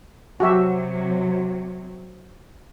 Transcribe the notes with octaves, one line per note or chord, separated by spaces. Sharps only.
C3 F#3 F#4 G4 E5